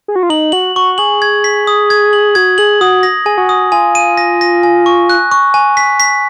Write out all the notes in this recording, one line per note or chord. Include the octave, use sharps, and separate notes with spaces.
G#4
F#4
F4
D#4 F#7
F#4 F#7
F#4 C#6
G#4 F#7
G#6
B6
D#6
G#6
F#7
F#4 G#6
G#4 F#7
F#4 D#6
A#6
G#4 G#5
F#4
D#6
F4 G#5
D#7
A#6
A#6
G#5
C#6
F#6
C#6
G#5
B6
B6